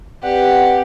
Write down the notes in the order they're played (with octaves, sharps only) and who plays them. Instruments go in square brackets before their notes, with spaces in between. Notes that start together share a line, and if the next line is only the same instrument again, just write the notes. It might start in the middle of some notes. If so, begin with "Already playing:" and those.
[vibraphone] C4 B4 D5 [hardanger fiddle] G4 [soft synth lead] F#5